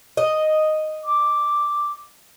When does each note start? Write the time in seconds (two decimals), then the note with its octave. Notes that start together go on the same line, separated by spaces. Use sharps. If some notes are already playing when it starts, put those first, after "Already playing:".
0.17 D#5
1.04 D6